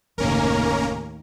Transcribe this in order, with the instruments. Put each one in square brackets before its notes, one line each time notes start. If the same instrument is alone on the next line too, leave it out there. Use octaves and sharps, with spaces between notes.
[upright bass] F#1 C3 [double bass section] D#2 A2 [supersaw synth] A#3 C#4 A#4